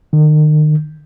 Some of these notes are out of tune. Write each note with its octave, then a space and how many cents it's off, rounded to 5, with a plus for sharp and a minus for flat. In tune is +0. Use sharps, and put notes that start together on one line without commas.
D#3 -35